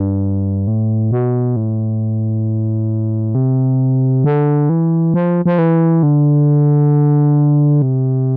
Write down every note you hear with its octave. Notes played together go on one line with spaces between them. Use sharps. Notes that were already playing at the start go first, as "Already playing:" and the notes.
Already playing: G2
A2
B2
A2
C3
D3
E3
F3
F3
E3
D3
C3